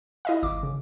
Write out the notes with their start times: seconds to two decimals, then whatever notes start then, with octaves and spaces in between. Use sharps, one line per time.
0.25 E4 D#5 F5
0.43 G#1 D6
0.63 C#3